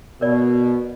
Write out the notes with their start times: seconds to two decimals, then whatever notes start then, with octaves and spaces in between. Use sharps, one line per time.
0.21 B2 A#4 D5